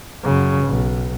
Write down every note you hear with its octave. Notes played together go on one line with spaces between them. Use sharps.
F#2 C#3
B1